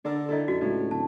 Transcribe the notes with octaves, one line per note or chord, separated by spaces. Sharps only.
D3 D4 A4 A#4
D#3 E4 A4
F#2 F#4
C#2 A2
D1 A5